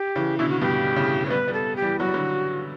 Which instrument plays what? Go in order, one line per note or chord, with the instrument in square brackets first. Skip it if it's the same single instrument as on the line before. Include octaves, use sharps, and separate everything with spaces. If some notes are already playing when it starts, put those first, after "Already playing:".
Already playing: [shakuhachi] G4
[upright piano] C#3 E3
[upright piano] B2 D3 [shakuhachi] E4
[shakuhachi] F#4
[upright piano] G2 B2 [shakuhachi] G4
[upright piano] A2 C#3
[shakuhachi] C#5
[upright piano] G3 B3 [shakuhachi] B4
[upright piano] G3 B3
[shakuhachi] A4
G4
[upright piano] E3 G3
[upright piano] F#3 [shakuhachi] F#4
[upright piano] G3
D3 F#3